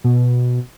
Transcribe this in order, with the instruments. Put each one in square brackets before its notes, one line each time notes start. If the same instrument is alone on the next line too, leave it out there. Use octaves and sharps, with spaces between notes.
[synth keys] B2